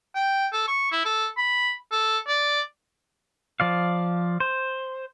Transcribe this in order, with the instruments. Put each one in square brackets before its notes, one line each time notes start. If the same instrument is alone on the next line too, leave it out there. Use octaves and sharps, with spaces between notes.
[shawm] G5
A4
C#6
E4
A4
B5
A4
D5
[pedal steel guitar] F3 D5 F5
C5